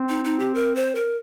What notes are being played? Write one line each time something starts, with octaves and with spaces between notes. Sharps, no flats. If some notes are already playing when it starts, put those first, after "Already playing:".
Already playing: C4
D#4
D#4
G4
A#4
C5
A#4